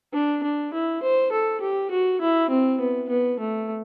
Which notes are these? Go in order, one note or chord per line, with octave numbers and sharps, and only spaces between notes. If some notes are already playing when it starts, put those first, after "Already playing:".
D4
D4
E4
C5
A4
G4
F#4
E4
C4
B3
B3
A3